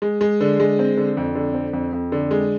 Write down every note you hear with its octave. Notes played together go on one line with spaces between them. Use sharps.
G#3
G#3
D3
G#3
C4
D3
F2
D3
C4
F2
F2
D3
G#3